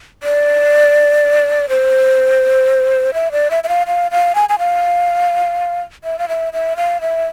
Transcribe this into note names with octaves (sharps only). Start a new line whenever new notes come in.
D5
C5
E5
D5
E5
E5
F5
F5
F5
G#5
G#5
F5
E5
F5
E5
E5
F5
E5